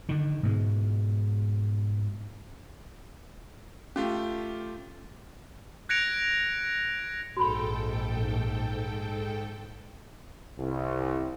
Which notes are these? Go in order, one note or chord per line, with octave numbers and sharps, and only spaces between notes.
D3 D#3
G#2 B2 G#3
A3 C#4 F4 G4
F#6 G#6 A#6 C#7 D7 F7
A#1 G#2 F#4 A4 G5 B5
C2